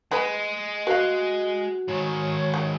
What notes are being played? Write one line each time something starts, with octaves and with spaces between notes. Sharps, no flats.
G#3 G#4 B4
F#4 B4 F5
G#2 D#3 C#5
C#3